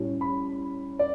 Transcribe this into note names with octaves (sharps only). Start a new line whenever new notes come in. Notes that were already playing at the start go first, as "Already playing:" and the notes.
Already playing: A2 G3 C#4
B5
D5